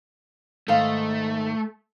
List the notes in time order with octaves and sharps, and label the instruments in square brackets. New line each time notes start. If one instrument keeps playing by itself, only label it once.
[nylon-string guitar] G#2 D#3 F5 [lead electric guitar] A3